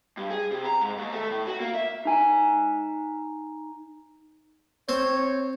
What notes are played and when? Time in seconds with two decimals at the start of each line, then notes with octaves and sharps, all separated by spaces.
0.17 G2
0.31 G#4
0.51 C3
0.65 A#5
0.81 G#2
0.98 D#2
1.13 A3
1.30 A2
1.47 F#4
1.60 A#3
1.75 E5
2.05 D#4 G#5
4.89 C4 C5 C#5